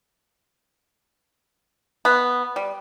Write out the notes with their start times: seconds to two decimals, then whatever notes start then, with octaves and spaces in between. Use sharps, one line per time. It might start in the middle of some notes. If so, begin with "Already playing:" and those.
2.05 B3
2.56 G3